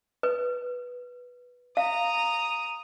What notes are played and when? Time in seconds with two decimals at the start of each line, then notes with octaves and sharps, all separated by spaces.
0.23 B4
1.77 F5 A#5 D#6